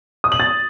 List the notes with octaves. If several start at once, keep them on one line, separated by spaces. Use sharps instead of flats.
D#6
F#7
A6